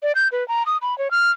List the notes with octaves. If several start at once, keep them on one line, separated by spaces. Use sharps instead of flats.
D5
G6
B4
A#5
D#6
B5
C#5
F6